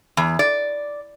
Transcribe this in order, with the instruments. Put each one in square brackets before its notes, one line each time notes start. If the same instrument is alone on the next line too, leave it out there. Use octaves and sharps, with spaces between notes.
[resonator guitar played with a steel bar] E2
D5